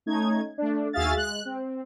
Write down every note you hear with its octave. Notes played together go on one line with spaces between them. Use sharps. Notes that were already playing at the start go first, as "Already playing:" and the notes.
A3 C#4 D#4 G#6
A3 D4
D#2 F#4 G#4 E5 F5 A6
G#3 F#6
C4